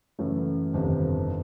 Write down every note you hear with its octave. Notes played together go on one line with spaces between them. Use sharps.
F#2 C#3 E3 A3
G1 F2 C3 D#3